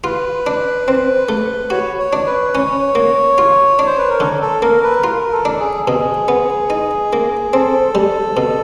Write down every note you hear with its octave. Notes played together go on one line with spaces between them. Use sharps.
F4 B4
D4
C4
A3
F#4 C#5
C#5
D4
B4
C#4 C#5
A#3
F4
D4
C5
B4
A#4
D3 A4
A4
A#3 A#4
B4
F4 A#4
A4
D4
G#4
B2 G#4
B3
D#4
A#3
C4 A4
G3
B2